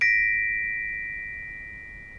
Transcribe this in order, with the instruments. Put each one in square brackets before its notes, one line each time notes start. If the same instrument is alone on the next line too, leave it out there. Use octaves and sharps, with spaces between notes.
[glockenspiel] A#6 B6 D7